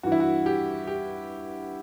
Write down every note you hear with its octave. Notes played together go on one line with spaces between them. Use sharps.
G2 E3 F#4
E4
F#4
G4
G4